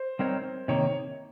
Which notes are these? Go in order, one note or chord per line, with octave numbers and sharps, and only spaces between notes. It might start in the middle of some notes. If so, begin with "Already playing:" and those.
Already playing: C5
G3 C4 D#4 A#4 C#5
C3 D#3 A#3 C#5